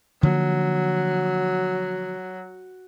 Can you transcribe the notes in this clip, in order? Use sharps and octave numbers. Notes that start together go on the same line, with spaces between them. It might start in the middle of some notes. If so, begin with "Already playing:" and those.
D3 F3 F#3 A#3